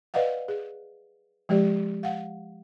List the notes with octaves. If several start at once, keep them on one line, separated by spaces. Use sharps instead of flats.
B4 D5 D#5 F5 F#5
G#4
F3 G#3 G4 D5
F5 F#5